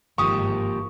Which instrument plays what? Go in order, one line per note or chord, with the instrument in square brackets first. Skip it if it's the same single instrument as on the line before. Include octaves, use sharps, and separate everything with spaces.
[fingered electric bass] G1 D#3 [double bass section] G#2 [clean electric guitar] F3 A#3 G4 [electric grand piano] C#6 D#6